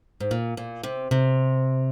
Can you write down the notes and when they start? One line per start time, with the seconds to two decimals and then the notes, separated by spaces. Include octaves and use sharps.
0.20 G#2
0.31 A#2
0.57 A#2
0.83 C3
1.11 C3